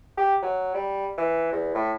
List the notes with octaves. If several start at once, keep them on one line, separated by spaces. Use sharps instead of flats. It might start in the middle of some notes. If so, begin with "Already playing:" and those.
G4
F#3
G3
E3
E2
A2